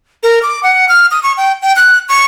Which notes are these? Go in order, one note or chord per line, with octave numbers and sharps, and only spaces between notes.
A#4
D6
F#5
F6
D#6
C#6
G5
G5
F#6
C#6